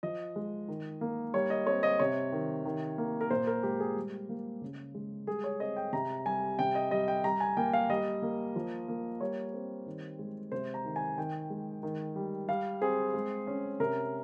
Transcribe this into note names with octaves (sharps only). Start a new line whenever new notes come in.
F3 D#5
G#3
D#3
A#3
G3 C#5
D#5
C4 C#5
D#5
C3 C#5
D#3
D#3
A#3
A#4
A#2 C5
A#4
G#3 G4
G#4
G3
A#3
C#3
G#3
G3 G#4
C#5
C4 D#5
G5
C3 A#5
G3 G#5
C3 G5
D#5
G3 D#5
G5
G3 A#5
G#5
A#3 G5
F5
G3 D#5
A#3
F3
A#3
G3 C#5
C4
D#3
G#3
C3 C5
A#5
D#3
G#5
D#3 G5
G#3
D#3
G3
G3 F5
C4 G#4
G#3
C#4
C3 A#4